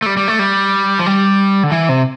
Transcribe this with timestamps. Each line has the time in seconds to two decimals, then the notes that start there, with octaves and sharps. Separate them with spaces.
0.02 A3
0.06 G3
0.17 G3
0.28 A3
0.39 G3
0.99 F3
1.06 G3
1.63 D3
1.72 E3
1.89 C3